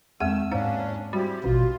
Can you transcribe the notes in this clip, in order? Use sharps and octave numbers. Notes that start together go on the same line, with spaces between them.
E2 D#3 G#3 A3 C4 F#5 E6
D#2 G#2 C#4 D4 F5
G3 C4 E4 F#4 G4
A1 B2 F4